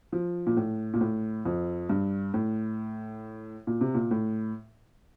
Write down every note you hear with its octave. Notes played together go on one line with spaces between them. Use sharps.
F3
A#2
A2
A#2
A2
F2
G2
A2
A#2
C3
A#2
A2